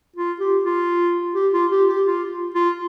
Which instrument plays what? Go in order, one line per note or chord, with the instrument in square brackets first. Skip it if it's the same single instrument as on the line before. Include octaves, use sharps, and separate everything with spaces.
[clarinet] F4
G4
F4
G4
F4
G4
G4
F4
F4